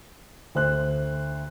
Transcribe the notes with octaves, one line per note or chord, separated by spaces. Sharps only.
D2 C5 F#6